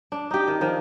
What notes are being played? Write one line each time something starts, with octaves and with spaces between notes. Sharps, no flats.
D4
D#4 G4
D#3
D#3 F3 D4